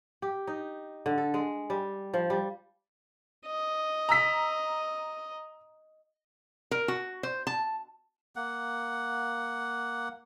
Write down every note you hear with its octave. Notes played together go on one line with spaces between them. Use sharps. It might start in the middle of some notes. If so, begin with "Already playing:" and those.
G4
D#4
D3
A4
G#3
G3
F3
G3
D#5
A#5 E6 B6
A#4
F#4
C5
A5
A#3 F#5